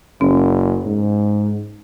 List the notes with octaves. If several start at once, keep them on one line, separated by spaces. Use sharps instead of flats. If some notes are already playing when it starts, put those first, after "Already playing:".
F#1 C#4
G#2